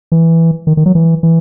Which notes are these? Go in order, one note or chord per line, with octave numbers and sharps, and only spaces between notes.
E3
D#3
D#3
F#3
E3
E3